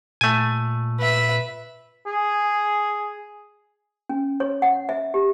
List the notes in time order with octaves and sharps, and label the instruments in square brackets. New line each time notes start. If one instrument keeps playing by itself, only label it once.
[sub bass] A#2 [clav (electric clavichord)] A3 G#5
[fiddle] B4 E5
[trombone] G#4
[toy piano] C#4
C#5
F#5
E5
G4